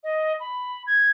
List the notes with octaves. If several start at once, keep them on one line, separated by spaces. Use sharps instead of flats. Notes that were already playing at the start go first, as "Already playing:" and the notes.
D#5
B5
G#6